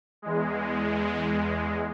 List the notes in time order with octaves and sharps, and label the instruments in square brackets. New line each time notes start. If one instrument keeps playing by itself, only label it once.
[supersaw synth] E2 G#3